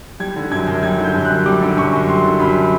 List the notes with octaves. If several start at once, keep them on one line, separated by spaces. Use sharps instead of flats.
G3 G#6
D3
F#2 G#6
F#2
G3 G#6
D3
G6
F#2
F#2 F#6
G3 D6
D3
F#2 C#6
F#2
G3 C6
D3
F#2 B5